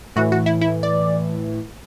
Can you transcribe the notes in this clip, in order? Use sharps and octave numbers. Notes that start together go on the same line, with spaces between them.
A2 E3 F#4
F#4
E4
E4
D5